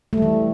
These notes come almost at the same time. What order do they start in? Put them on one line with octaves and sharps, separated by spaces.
A3 G3 E3